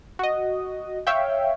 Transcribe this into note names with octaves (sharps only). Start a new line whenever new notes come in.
F#4 D#5
C#5 E5 F5 G5